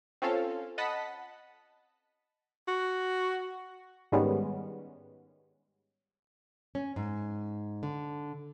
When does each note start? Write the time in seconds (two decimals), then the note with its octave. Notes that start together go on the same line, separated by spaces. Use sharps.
0.22 C4 C#4 F4 A4 F5
0.78 D#5 F#5 A5 B5 B6
2.68 F#4
4.12 G#2 D#3 G3 G#3 B3 C#4
6.75 C#4
6.96 G#2
7.83 D3